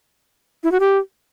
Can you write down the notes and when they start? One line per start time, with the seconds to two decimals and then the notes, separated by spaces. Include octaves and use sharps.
0.64 E4
0.72 F#4
0.80 G4